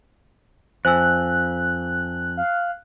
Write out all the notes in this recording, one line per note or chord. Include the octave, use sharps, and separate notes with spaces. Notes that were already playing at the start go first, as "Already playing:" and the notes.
F2 C5 G#5 E6 F#6
F5